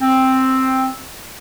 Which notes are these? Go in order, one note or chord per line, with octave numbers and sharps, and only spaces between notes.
C4